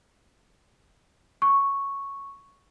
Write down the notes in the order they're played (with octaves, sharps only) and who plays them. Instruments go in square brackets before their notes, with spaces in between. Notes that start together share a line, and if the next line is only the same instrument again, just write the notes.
[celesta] C#6